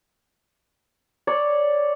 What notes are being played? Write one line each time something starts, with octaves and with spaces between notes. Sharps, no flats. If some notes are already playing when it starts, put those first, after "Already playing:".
C#5 D5